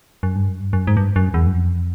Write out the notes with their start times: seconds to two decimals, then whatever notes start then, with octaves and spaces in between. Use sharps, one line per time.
0.23 F#2
0.36 G2
0.49 F#2
0.61 G2
0.73 F#2
0.87 G#2
0.97 G2
1.16 F#2
1.34 E2
1.47 F#2
1.53 F2